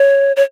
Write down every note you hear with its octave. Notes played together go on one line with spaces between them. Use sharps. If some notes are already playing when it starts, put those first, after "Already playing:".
Already playing: C#5
C#5